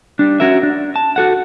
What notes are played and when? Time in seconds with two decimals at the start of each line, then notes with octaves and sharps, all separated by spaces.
0.19 G3 D4
0.40 C#4 F#4 A#4 E5
0.63 D4
0.96 A5
1.16 F#4 A4 F#5